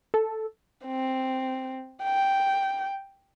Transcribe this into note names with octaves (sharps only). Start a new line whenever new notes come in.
A4
C4
G5